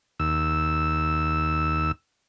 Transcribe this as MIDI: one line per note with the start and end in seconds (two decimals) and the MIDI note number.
0.20 1.92 39
0.20 1.92 88